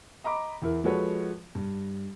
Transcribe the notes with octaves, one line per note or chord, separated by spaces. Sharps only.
D#5 A#5 B5 D6
E2 E4 A#4
F3 G#3 F#4 A4 B4 C#5
G2